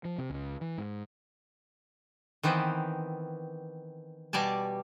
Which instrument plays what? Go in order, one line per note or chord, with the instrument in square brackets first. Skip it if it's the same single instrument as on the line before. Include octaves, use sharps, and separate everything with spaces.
[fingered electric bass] F3
C3
C#2
E3
G#2
[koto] D#3 E3 B3 C4
B2 G3 D5 G#5 A5